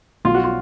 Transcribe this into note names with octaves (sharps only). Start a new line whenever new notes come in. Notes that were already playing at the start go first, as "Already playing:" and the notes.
B1 F4
F#4
F4